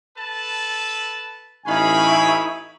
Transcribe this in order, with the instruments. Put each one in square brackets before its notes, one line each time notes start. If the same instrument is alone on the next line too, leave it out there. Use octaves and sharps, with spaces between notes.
[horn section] A4 B4 A5
[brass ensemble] A1 G#5 [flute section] D#4 E4 C#6 [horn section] F5 B5